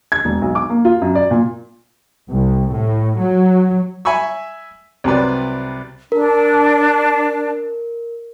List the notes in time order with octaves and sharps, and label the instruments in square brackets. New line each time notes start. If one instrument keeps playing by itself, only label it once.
[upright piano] G#6
E1
B1
D6
A#3
F4
F#2
D5
A#2
[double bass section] C2
A2
F#3
[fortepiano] E5 G#5 B5 C#6 E6
C2 C3 F#3 G3 B4 D5
[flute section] D4 [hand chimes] A#4